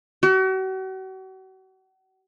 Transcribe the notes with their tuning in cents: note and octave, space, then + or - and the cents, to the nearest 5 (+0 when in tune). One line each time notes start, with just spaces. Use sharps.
F#4 +40